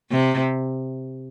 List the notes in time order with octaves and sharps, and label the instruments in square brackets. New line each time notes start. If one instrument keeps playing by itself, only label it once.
[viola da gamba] C3